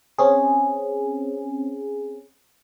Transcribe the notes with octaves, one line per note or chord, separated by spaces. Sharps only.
C4 C#4 G#4